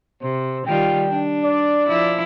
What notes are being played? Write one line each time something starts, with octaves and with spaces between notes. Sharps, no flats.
C3 C5
D#3 G3 F4 G5
D4
D5
F3 E4